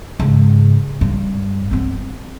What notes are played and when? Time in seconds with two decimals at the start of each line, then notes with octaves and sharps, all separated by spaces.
0.20 G#2 C#3
1.01 G2
1.71 B3 C4